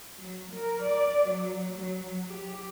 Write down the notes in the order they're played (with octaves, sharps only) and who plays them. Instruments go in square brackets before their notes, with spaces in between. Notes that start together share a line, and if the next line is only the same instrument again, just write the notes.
[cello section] F#3
A#4
D5
F#3
F#3
G4